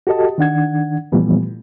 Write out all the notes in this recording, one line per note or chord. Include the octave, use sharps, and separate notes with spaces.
F#4 G4 A4 D#5 A5
D#3 D4 F#5 G#6
A#2 E3 F3 G3 A3 B3